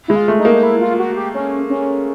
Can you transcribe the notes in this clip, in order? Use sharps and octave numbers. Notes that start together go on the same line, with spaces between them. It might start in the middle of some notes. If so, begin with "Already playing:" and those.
G#3 E4
F4
A3
D#4
A#3
D#4
E4
F4
F#4
G4
C#4
C#4